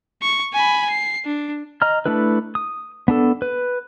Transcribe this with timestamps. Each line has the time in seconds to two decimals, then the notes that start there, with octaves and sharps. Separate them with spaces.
0.22 C#6
0.54 G#5 B5
0.90 C7
1.25 D4
1.82 D#5 A#5 F6
2.06 A3 D4 E4 B4
2.55 D#6
3.08 B3 D4 A4
3.42 B4